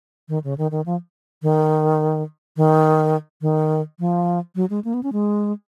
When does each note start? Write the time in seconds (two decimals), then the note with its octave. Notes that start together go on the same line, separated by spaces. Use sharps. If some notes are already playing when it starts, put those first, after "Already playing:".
0.29 D#3
0.44 C#3
0.58 D#3
0.71 D#3
0.86 F3
1.42 D#3
2.57 D#3
3.41 D#3
3.99 F3
4.56 F#3
4.70 G#3
4.84 A#3
4.94 B3
5.03 C#4
5.13 G#3